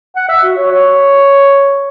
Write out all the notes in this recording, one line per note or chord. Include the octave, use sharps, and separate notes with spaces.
F#5
E5
F#4
C#5
C#5